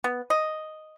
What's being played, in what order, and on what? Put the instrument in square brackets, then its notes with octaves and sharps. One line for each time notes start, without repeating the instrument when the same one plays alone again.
[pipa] B3
D#5